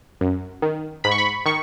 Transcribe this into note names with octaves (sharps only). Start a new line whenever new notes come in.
F#2
D#3
G#2 B5
C#6
B5
D#3 C#6